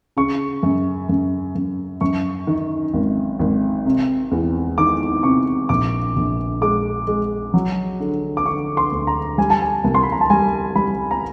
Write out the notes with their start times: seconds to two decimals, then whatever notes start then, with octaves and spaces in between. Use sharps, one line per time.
0.17 C#3 C#6
0.63 F#2
1.09 F#2
1.55 F#2
2.01 F#2 C#6
2.47 D#3
2.93 G#1
3.39 G#1
3.86 C3
4.31 E2
4.78 D#3 D6
5.23 C3 C#6
5.69 A#1 D6
6.16 A#1
6.62 G#3 D6
7.07 G#3
7.54 F#3
8.00 D3
8.37 D6
8.46 D3 C#6
8.77 C6
8.92 D2
9.07 A#5
9.38 G3 G#5
9.50 A5
9.61 G#5
9.84 C2
9.95 C6
10.03 B5
10.12 A#5
10.21 A5
10.30 G3 G#5
10.76 G3 B5
11.11 A#5